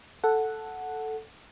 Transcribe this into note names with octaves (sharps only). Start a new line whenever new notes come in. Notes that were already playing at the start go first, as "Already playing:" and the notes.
A4 F#5